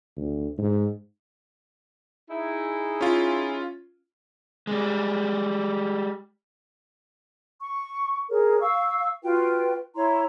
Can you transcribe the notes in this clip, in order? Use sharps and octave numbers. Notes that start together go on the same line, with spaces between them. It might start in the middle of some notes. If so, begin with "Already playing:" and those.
D2
G#2
D#4 E4 G#4
C#4 F4
G3 G#3
C#6
G#4 A#4 C#5
F5 C#6 E6
F4 F#4 B4 G5
E4 C#5 A#5 C6